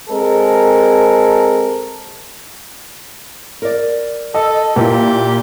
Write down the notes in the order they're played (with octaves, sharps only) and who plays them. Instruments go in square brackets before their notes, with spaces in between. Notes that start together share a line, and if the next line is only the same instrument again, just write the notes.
[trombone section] G#3 C4 A4 A#4
[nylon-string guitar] A#4 D5
[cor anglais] A4 [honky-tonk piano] D#5
[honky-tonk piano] A#2 A#3 E4 [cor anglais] G4